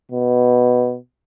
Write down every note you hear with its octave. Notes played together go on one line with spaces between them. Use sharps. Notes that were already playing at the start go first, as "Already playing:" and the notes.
B2